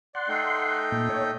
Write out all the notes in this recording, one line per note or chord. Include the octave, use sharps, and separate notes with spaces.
D5 F#5 C6
A3 D#4 G5
A#2
C#5